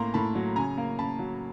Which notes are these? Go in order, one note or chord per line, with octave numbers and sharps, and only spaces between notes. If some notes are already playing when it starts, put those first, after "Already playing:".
Already playing: A2 A#3 A#5 C6
A2 A5 B5
F#3
C#3 G#5 A#5
A#3
C#3 A5 B5
F#3